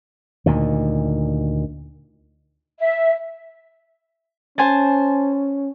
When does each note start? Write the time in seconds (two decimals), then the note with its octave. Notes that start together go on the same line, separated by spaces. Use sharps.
0.46 D2 A#2 D#3
2.80 E5
4.58 C#4 C5 G#5 A5